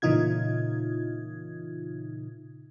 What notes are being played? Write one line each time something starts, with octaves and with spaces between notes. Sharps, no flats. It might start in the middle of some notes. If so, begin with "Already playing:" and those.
A#2 C#3 E3 D#4 F4 G#6